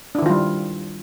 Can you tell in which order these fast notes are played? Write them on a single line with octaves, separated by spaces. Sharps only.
D4 E4 D#3 F4 G3